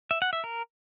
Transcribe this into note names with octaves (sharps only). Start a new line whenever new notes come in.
E5
F#5
E5
A#4